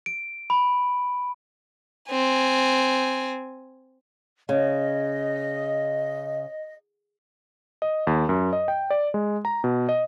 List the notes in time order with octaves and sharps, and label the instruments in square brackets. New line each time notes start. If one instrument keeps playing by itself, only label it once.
[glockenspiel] D7
B5
[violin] C4 G#5
[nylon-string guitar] C#3 [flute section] D#5
[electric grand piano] D#5
D#2
F#2
D#5
G5
D5
G#3
A#5
B2
D#5